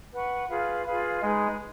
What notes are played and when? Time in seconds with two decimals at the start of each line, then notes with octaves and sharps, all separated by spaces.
0.13 B4 F#5 C#6
0.49 F4 G#4 B4 F5
0.86 F4 G#4 B4 F5
1.22 G#3 D#4 G#4 B4